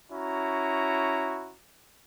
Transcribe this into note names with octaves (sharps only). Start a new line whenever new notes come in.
C#4 E4 F#4 A#5